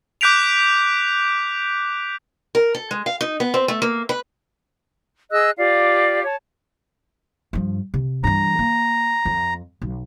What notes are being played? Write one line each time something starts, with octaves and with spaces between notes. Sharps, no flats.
D6 F#6 G6 B6 D7 F7
A#4
A4
G#3
F5
D#4
B3
C4
A3
A#3
B4
G#4 D#5 E6 F#6
F4 G4 D5 F5
C#5 A5
G2 F3
C3
G2 E3 A#5
A#3
F2
B1